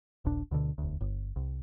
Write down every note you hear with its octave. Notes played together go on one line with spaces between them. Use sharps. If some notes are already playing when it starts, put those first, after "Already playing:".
D#1 A#1 D4
D2 B2 D3
E1 D2
G1
C2